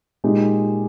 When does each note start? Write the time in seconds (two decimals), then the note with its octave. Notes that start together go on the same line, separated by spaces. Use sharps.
0.24 A#2 G#3 D#4 G4